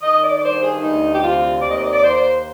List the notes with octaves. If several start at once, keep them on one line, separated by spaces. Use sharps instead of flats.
D#3 D#5
D5
D5
G2 C5
G#4
D2 D#4
G4
C3 F4
D#2 D5
D#5
D5
D#5
D5
D#2 C5